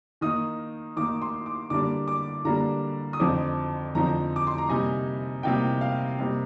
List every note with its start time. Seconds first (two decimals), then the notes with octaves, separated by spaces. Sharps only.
0.21 D#3 A#3 D#4 D#6
0.96 D#3 A#3 D#4 D6
1.22 C6
1.46 D6
1.70 D3 G3 A#3 D4 D6
2.08 D6
2.45 D3 G3 A#3 D4 A#5
3.13 D#6
3.20 F2 D3 F3 C4 D#4 D6
3.95 F2 D3 F3 C4 D#4 A#5
4.36 D6
4.47 C6
4.58 A#5
4.69 C3 G3 A#3 D#4 G#5
5.43 C3 G3 A#3 D#4 G5
5.81 F5
6.19 C3 G3 A#3 D#4